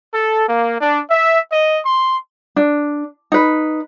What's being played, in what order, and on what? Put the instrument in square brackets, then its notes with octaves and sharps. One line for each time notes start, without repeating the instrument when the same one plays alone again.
[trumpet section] A4
A#3
D4
E5
D#5
C6
[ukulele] D4
D#4 B4